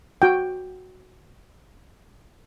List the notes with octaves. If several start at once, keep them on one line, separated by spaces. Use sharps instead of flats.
F#4 G5